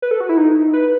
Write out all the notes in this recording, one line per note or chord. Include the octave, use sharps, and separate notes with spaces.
B4
A4
F#4
E4
D#4
B4